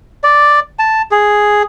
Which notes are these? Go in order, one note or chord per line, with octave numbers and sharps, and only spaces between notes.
D5
A5
G#4